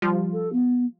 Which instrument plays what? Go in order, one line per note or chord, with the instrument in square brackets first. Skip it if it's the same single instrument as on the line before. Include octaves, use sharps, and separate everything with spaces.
[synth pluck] F3 G3 F4
[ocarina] A4
B3